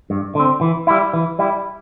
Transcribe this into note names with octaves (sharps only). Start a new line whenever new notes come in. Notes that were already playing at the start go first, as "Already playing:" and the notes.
G2
D3 C4
E3
G3 E4
E3
G3 E4